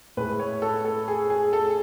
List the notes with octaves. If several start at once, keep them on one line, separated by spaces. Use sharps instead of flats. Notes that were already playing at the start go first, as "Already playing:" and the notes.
A2 G#3 B4
C#5
A4
A4
G#4
G#4
A4